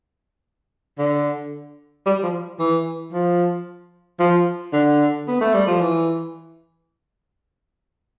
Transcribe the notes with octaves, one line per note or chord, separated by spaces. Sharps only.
D3
G3
F3
E3
F3
F3
D3
B3
A3
G3
F3
E3